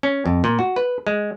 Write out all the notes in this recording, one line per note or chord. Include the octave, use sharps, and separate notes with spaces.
C#4
F2
A#2
F#4
B4
G#3